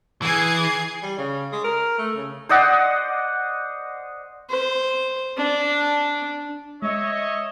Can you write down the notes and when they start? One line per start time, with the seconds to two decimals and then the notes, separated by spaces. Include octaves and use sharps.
0.22 E3 G#4 G#6 C7
1.03 G3
1.18 C#3
1.52 G#3
1.64 A#4
1.98 A3
2.16 C#3
2.49 C5 D5 D#5 F#5
4.50 C5
5.37 D4
6.82 G#3 C#5 D#5 E5